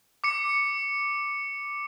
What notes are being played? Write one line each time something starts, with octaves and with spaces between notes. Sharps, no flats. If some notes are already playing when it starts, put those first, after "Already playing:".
D6 C#7